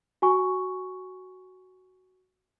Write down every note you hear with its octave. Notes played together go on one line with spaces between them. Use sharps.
F#4 G#5 C#6